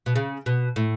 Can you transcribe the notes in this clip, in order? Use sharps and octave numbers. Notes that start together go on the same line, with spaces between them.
B2
C#3
B2
A2